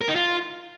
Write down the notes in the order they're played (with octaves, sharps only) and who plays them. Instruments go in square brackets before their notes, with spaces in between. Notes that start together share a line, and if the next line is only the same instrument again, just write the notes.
[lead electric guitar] A#4
D#4
F4